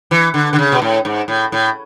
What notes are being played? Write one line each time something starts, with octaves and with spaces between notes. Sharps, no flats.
E3
D3
D3
C#3
B2
A2
G#2
A2
A2